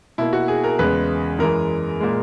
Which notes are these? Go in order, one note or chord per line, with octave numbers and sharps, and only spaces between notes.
B2 A#3 E4
F#4
G#4
A#4
E2 C#3 G#3 B4
F#2 E3 G#3 A#4
A#2 G#3